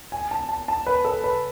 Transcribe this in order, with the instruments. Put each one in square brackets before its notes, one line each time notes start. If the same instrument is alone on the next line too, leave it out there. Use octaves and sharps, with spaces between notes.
[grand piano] G#5
A5
A5
A5
B4
A4
B4